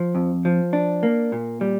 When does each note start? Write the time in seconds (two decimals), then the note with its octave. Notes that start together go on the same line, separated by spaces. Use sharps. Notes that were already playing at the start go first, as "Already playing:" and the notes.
Already playing: F3
0.15 F2
0.45 F3
0.73 D4
1.03 A#3
1.32 A#2
1.61 G3